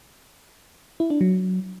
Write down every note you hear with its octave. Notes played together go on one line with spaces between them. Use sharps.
E4
D4
F#3